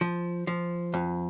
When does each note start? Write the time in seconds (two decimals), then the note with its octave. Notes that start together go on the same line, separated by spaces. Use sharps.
0.01 F3
0.47 F3
0.94 F2